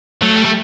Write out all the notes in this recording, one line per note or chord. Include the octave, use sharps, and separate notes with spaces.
F#3 A3
G3
A3